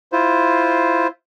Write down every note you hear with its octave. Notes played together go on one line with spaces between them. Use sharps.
E4 F4 C5